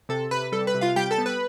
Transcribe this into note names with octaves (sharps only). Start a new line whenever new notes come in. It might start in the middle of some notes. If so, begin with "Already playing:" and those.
C3 A4
C3 B4
G3 A4
B4
C3
F4 F5
G3 G4 G5
A4 A5
B3
B4